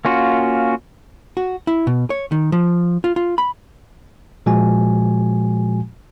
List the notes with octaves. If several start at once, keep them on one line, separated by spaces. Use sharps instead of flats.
A#3 C#4 F4 F#4
F#4
E4
B2
C#5
D#3
F3
F4
F4
B5
A#2 F3 G#3 F#4 G#5